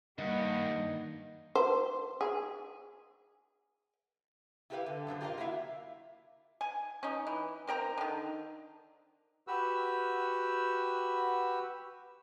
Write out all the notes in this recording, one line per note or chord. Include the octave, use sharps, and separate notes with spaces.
G2 D#3 G3 A#3 D#5 F#5
C5
G#4
E4 F4 G4 A#4 B4 F5
D3
F#2 B2 D3 C5
F4 G4 A#4 C#5 D#5 F5
A#3 E4 F#4 C#5 E5 F5
G#5
C#4 D#4
E3
C4 A#4 G5 A#5
D3 D#3
F#4 G4 B4 E6